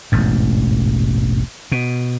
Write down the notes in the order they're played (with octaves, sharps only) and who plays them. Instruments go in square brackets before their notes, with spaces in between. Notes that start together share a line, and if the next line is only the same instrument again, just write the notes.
[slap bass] E1 A1 G#2
B2